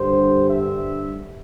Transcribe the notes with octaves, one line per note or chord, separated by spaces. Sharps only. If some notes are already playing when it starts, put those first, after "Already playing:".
Already playing: G2 D3 G3 C5
E5